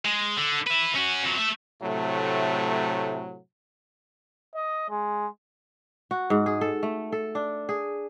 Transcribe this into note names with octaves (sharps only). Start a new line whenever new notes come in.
G#3
D3
B4 E5
C#4 F#4
F2 F#3
A3 E5
A2 C3 F#3 A3
D#5
G#3
F#4
G#2
G#4
A4
A3
A4
D4
G#4